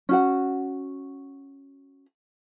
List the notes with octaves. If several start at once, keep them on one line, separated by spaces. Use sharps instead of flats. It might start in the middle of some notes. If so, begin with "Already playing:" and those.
C#4 F#4 F#5